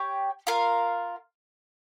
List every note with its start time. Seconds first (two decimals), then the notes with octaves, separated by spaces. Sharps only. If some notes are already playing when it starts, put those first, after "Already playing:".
Already playing: G4 C#5 G5
0.47 F4 A#4 F5